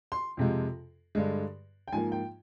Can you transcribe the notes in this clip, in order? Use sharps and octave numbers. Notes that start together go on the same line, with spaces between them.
C6
F2 C3 F3 G#3
G2 D3 G#3
G5
G#2 F3 A#3 G#5
G5